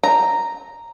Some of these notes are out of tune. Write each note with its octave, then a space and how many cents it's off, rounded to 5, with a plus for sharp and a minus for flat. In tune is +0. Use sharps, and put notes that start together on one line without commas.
A#5 -5